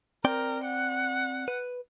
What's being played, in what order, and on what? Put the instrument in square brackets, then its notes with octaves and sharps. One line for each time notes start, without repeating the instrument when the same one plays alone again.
[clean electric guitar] C4 D5 G5 [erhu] A#4
[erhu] F#5
[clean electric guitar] B4